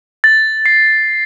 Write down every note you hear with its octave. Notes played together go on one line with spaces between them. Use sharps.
A6
C7